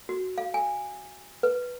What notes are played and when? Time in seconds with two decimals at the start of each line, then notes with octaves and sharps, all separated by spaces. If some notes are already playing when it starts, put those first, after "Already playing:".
0.09 F#4
0.38 F5
0.54 G#5
1.43 B4